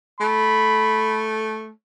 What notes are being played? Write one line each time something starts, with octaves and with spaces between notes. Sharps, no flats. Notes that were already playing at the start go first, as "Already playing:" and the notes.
A3 B5